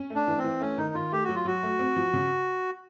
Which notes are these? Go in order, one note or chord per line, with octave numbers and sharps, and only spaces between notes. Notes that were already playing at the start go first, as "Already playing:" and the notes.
Already playing: C#4
A3
D4
E3
C4
E3
A3 C#4
D#3 D#4
D#3 F4
A3 G4
F#4
F#3
F4
F#3 F#4
A3
C4
F3
C#3